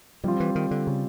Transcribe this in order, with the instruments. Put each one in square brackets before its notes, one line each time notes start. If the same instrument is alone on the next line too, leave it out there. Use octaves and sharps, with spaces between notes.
[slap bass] F3 [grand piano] G3 C4 F4
[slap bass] E3
D#3
D3
C#3